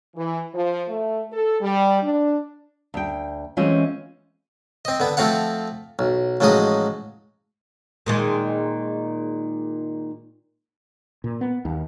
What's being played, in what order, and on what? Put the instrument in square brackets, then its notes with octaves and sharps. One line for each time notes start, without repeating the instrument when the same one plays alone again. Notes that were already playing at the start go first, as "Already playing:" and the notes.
[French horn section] E3
F3
A3
A4
G3
D4
[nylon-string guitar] D2 G5
E3 G#3 A3 C4 C#4 F4
[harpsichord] C4 D#5
D3 B3
F3 A3 C4 F5 F#5
B1
A1 F3 F#3 G#3 D#5 D#6
[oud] A#2 D#3 G#3
[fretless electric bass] A#2
B3
D#2